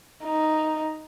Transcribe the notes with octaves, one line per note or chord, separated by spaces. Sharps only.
D#4